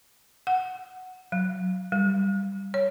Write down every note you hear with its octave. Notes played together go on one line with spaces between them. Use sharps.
F#5
F#3
G3
C#5